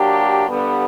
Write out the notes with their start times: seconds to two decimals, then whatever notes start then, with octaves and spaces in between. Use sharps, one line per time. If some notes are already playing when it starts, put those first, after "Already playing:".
Already playing: F#3 A#3 D4 G4
0.49 G2 D3 G3 B3